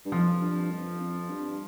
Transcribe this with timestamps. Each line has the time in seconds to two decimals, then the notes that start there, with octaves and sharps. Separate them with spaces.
0.05 G2
0.12 F2 F3
0.42 G2
0.71 F2
1.00 F2
1.29 G2